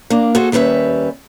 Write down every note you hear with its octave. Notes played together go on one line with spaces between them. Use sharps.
A#3 D4
F#4 G#4 A4 C5
D#2 G3 C#4 B4 E5